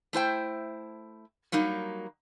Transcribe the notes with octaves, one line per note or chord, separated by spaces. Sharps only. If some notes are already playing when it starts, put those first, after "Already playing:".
A3 E4 C5 G5
F#3 G3 A#3 D#4